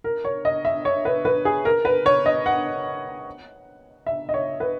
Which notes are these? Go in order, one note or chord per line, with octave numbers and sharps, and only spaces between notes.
A#4
C#5
D#5
E5
C#5
B4
B4
G#4
A#4
B4
C#5
D#5
F#5
E5
D#5
C#5
B4